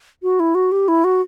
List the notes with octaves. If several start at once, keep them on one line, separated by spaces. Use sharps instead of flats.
F#4
E4
F#4
G4
E4
F#4